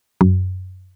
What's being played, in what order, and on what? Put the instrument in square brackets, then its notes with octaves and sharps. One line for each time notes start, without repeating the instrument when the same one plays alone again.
[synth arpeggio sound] F#2